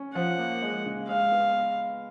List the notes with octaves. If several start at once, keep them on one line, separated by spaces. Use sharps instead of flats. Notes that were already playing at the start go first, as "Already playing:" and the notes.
Already playing: C#4
F3 F#5
A#3
G#3
C#3
G#3 F5
B3